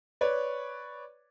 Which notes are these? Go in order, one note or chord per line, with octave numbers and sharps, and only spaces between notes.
B4 C#5 D5